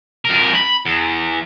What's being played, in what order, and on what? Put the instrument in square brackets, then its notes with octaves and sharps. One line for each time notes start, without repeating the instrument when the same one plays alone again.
[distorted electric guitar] F2 A#4
B5
E2